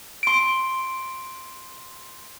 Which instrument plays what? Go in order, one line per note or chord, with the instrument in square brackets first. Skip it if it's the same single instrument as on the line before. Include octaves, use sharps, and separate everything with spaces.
[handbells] C6 D7